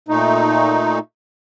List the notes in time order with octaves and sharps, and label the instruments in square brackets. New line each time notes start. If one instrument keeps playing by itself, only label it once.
[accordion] A#2 A3 D#4